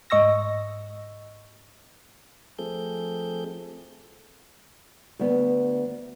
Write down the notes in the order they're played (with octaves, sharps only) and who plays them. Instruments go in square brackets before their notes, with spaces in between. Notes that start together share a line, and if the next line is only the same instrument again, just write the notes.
[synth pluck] G#2 D#5 C#6 E6 A#6
[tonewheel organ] F3 A3 C4 G#4 A4 G6
[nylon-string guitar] D2 B3